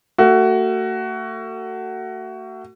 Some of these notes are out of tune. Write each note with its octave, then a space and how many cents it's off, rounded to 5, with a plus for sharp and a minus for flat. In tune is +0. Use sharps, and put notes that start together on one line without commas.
A3 +35 F#4 +20